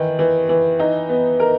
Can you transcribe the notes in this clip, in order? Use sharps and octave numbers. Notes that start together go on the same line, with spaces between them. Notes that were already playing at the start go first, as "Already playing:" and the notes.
Already playing: D#3 E3
E3
E3
D#4
B3
A#4